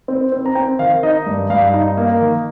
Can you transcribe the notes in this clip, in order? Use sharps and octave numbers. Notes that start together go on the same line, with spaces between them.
C4
C4
A#5
C4 G5
D#3 F5
D#4 D#5
G2
G2 F5
D#4
A#3
D#3